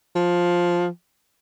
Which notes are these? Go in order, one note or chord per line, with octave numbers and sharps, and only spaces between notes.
F3